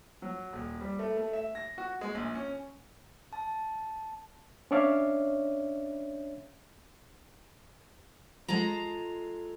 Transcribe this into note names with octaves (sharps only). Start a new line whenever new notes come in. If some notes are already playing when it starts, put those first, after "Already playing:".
F#3
D#1
G3
A3
A3
E5
A#6
F#4
G#3
A#1
C#4
A5
C#4 D4 C#5 D5 E5 F5
G#3 F4 A4 A#5